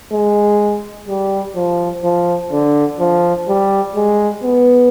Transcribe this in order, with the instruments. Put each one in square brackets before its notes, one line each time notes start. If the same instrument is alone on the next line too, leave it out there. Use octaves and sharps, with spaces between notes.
[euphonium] G#3
G3
F3
F3
D3
F3
G3
G#3
B3